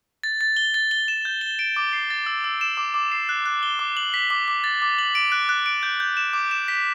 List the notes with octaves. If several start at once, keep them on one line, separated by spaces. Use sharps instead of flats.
A6
A6
G7
A6
G7
E7
G6
G7
D7
D6
C7
A6
E6
E6
E7
D6
D6
C7
F#6
F#6
G7
D6
F#7
B6
D6
D6
A6
D6
F#7
D7
F#6
F#6
D7
G6
G6
E7
D6
E7
B6